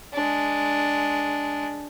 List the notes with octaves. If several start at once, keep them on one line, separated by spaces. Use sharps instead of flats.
G#3 D4